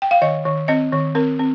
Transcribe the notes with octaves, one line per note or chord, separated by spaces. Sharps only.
G5
F5
D#3 D#5
D#3
C4 D#5
D#3
C4 A#4
C4